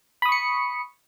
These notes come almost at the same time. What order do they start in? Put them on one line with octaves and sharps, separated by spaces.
B5 D#6 C#6 C#7